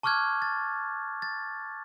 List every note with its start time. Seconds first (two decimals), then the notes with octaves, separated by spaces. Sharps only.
0.03 A5 C#6 D6 F6 F#6 G#6
0.42 A6
1.22 A6